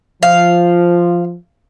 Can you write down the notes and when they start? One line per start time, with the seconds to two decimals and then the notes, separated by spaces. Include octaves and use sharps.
0.23 F3 F5